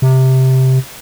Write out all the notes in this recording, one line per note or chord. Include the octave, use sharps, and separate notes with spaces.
C3